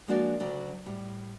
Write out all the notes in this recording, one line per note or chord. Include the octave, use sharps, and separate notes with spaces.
F3 G#3 A#3 D4 F#4 D5
D2 C#3 F#3 D5
A2 G3